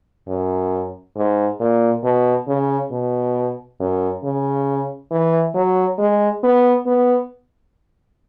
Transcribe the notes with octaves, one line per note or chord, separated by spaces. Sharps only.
F#2
G#2
A#2
B2
C#3
B2
F#2
C#3
E3
F#3
G#3
B3
B3